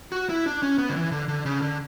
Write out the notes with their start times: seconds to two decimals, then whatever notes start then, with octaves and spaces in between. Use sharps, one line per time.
0.12 F#4
0.29 E4
0.46 D4
0.63 C#4
0.78 B3
0.89 D3
0.96 E3
1.12 D3
1.28 D3
1.46 C#3
1.62 D3